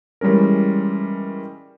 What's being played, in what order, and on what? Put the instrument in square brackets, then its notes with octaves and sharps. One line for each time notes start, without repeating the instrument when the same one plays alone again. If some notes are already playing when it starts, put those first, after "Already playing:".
[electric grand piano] E3 G3 G#3 C#4 A#4